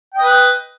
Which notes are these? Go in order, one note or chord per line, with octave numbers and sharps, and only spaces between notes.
B4 D#5 G5